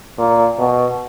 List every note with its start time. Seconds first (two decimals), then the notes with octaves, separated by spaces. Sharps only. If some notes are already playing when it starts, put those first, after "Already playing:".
0.18 A#2
0.59 B2